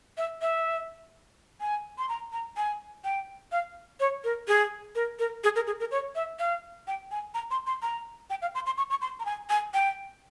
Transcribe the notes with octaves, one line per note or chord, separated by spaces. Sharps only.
E5
E5
G#5
C6
A#5
A#5
G#5
G5
F5
C#5
A#4
G#4
A#4
A#4
G#4
A#4
G#4
A#4
C#5
E5
F5
G5
G#5
A#5
C6
C6
A#5
G5
F5
C6
C6
C#6
C#6
C6
A#5
G#5
G#5
G5